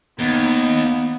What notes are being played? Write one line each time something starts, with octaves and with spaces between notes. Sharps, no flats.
D#2 B3